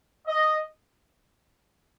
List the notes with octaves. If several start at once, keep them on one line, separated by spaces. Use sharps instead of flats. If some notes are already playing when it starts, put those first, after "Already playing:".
D#5